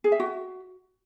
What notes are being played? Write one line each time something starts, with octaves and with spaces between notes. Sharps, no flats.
G#4
E5
F#4